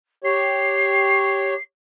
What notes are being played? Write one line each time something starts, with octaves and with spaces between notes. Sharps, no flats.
G4 C#5 C7